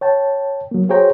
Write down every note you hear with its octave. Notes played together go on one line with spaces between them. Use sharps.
C#5 G5 A5
F#3 A#3
F#4 G#4 C5 C#5 G5 A#5